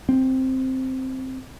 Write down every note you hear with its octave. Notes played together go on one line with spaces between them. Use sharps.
C4